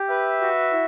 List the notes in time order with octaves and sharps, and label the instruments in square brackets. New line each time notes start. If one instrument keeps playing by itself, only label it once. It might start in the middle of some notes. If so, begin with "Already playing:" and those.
Already playing: [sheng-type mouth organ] G4
[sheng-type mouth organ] B4 [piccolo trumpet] E5
[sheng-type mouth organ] F#4
E4